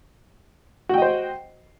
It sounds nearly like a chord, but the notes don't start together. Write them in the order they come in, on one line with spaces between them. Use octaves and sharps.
F#4 G5 D#5 C5